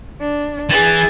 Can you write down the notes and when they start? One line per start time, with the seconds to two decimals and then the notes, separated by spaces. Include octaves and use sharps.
0.20 D4
0.69 E3 G#4 A6